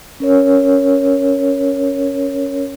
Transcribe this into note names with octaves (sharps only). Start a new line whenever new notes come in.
C#4 A#4 C#5